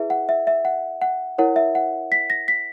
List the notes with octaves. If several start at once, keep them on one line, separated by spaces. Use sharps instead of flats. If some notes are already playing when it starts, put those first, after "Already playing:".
Already playing: E4 G#4 B4 E5
F#5
E5
E5
F#5
F#5
E4 A#4 C#5 F#5
E5
F#5
B6
A#6
B6